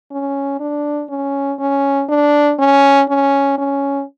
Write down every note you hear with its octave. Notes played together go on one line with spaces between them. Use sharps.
C#4
D4
C#4
C#4
D4
C#4
C#4
C#4